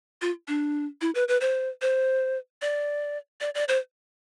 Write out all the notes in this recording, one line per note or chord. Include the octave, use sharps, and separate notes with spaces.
F4
D4
E4
B4
B4
C5
C5
D5
D5
D5
C5